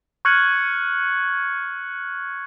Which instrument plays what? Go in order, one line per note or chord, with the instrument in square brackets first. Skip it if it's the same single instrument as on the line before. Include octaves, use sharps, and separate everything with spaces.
[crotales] C#6 F6 F#6 G#6 C#7 F#7